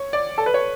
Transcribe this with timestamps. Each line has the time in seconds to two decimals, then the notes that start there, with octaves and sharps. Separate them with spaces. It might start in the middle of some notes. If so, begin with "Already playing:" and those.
Already playing: C#5
0.13 D5
0.38 A4
0.46 B4
0.54 C#5